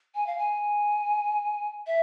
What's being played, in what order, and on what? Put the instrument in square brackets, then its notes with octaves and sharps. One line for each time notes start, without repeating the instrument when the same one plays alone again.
[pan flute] G#5
F5
G#5
E5